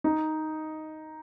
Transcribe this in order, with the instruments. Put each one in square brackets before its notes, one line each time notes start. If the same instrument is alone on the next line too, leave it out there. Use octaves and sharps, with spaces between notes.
[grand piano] D#4